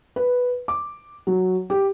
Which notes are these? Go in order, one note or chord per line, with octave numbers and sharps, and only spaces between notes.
B4
D6
F#3
G4